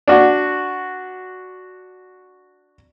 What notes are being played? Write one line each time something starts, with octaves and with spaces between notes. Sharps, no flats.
D4 F#4